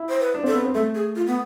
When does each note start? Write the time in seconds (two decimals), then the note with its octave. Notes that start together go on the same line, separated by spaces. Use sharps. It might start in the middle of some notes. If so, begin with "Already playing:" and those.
Already playing: E4
0.09 C5
0.21 B4
0.34 D4
0.44 C4 A4
0.54 B3
0.65 C4
0.75 A3 A4
0.95 G#4
1.16 F4
1.27 B3